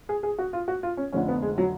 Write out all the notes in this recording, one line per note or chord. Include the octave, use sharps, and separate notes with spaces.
G#4
G#4
F#4
F4
F#4
F4
C#4
F1 F2 D3 C#4
B3
G#3
F#3